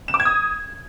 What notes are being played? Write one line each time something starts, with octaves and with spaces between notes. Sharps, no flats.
E7
D6
G#6
D#6